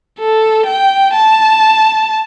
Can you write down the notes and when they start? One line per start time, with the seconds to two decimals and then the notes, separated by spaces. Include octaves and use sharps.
0.19 A4
0.66 G5
1.13 A5